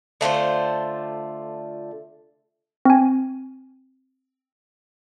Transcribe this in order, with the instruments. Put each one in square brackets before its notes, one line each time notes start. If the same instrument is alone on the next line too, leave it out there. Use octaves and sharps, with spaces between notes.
[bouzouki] D3 A3 F4 C5
[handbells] C4 G#5